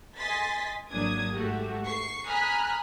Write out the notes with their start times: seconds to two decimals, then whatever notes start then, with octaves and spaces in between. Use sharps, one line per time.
0.17 D#5 G#5 C6 A6 B6
0.92 G#1 F#3 A#3 D4 D#6 G#6
1.33 G#2 A3 F#4 G4
1.85 C#6 C7
2.28 G#5 A#5 B5 D#6 F6 F#6